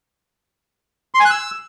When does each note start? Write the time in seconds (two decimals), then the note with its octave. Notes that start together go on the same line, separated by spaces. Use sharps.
1.15 C6
1.20 G#5
1.25 F#6
1.30 E6